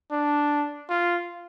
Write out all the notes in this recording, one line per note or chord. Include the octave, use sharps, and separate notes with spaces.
D4
F4